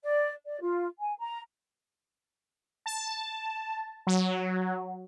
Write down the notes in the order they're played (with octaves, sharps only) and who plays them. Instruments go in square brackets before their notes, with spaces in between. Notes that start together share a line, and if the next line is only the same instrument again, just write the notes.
[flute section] D5
D5
F4
G#5
A#5
[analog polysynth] A5
F#3